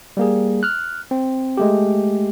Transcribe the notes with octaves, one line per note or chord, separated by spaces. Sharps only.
G3 A#3 G#4
F6 F#6
C4
G#3 A3 G4